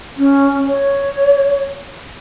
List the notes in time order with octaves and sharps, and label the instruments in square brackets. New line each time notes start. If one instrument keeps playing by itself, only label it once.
[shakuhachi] C#4
C#5